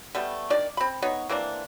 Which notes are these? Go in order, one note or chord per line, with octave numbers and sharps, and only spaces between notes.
G3 A3 B3
D#3 D4 D5
C4 B5
B3 D#4 C#5
E3 A#3 C4 D4